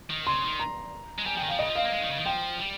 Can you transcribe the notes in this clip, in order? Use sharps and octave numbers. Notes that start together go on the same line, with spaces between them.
D#3
C#3 C6
D#3
A#5
G#3
G3 G#5
F3 G5
D#3
F3 F5
C#3 D#5
F3
C4 F5
A#3
G#3
D#3
C#3
D#3
F3 G5
G3